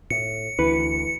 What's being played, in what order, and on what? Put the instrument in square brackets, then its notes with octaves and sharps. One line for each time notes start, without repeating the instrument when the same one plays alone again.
[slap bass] A2 [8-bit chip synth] C#7
[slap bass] D2 [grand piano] E3 [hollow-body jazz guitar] B4